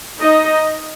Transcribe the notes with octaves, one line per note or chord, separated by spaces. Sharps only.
D#4 D#5